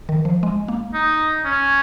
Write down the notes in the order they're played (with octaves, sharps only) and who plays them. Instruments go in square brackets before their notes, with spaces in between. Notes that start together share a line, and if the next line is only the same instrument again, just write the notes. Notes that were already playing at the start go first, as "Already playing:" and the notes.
[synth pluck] D#3
F3
G#3
A#3
[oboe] D#4
C#4